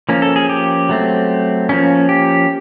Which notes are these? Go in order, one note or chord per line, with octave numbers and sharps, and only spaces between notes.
F3 A#3 C#4
A4
G#4
G4
F#3 A3 C4
F3 A#3 C#4
G4